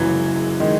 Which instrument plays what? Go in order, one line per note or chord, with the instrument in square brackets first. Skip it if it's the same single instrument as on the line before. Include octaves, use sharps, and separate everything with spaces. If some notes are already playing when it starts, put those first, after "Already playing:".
Already playing: [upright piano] F#1 F#2 C#3 G#3 C#4 [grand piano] E3 F#3
[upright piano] D#3 G#3 D#4